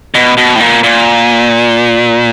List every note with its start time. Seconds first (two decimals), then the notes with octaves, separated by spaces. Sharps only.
0.15 B2
0.37 B2
0.55 A2
0.60 A#2
0.83 A#2